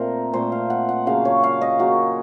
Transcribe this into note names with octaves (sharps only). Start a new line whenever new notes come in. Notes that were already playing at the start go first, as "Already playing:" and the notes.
Already playing: A#2 A3 C4 A#4 C5
A#2 A3 C4 C5
F5
F#5
F#5
C#3 F#3 A#3 F5
C#5
F5
D#5
C#3 F#3 A#3 F#4